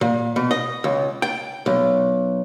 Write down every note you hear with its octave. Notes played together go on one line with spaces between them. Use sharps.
A#2
B2
D#5
C#2
G5
B1